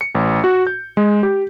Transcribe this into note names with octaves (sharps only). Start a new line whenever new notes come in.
C#7
A1
F#4
G6
G#3
G4